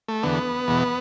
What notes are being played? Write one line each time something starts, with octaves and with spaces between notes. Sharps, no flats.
A3
E2 D3 B3
E2 B2